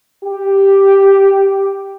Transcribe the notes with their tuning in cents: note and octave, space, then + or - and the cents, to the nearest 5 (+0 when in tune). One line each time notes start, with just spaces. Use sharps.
G4 +0